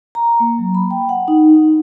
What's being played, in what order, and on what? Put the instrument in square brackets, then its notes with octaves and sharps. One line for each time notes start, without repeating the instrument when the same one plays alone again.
[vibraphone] A#5
A#3
F#3
B5
G5
F#5
D#4
D#4